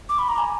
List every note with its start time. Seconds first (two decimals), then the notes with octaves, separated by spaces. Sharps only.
0.09 D6
0.19 B5
0.29 A#5
0.38 G#5